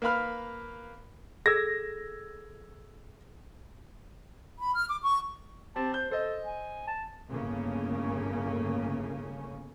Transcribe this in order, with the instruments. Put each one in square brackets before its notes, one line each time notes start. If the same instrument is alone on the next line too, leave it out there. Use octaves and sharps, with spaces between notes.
[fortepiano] A#3 B4 F5 B5 F6
[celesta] G#4 A4 [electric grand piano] E6 G#6 A#6
[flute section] B5
F6
D6
C#6
[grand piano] C4 G4 [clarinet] A5
[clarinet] C5 [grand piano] G6
[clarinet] A4 [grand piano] C5 D#5
[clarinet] G#5
A5
[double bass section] G1 A2 C#3 A#3 C#4